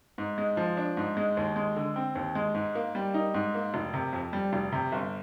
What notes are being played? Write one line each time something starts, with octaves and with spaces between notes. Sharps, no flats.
G#2
G#3
F3
D4
G#2
G#3
D#2
G#3
D3
C4
D#2
G#3
G#2
A#3
G3
D#4
G#2
A#3
F1
C3
F2
G3
F1
C3
G1